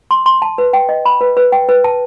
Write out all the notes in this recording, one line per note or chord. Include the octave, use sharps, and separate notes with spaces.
C6
C6
A5
B4
G5
D#5
B5
B4
B4
G5
B4
A5